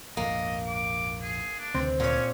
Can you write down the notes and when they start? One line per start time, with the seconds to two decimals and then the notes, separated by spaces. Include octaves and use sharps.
0.17 A#1 F2 G#2 A#3 D#5
0.67 D6
1.22 G#4
1.59 D4
1.74 D2 C3 D#3 C4
2.00 A#2 C#4 C#5